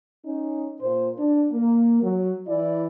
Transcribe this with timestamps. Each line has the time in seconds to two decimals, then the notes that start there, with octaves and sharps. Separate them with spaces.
0.25 C#4 D#4
0.80 A#2 C5
1.17 D4
1.52 A#3
2.03 F#3
2.48 E3 E4 D5